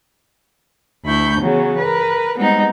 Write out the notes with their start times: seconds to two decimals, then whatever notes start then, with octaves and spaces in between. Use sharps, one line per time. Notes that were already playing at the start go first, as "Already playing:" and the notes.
1.05 D2 E4 B5 C#6 G6
1.39 C#3 E3 F#3 B3
1.79 A#4 B4
2.37 G3 G#3 B3 C4 D#4